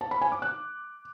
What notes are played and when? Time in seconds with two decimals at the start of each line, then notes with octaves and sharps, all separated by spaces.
0.01 A5
0.11 B5
0.21 G#5
0.32 D6
0.42 F#6